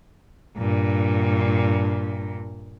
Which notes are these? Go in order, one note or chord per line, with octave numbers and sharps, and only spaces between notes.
G2 A#2